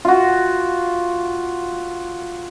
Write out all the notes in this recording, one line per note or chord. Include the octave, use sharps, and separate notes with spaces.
F4 F#4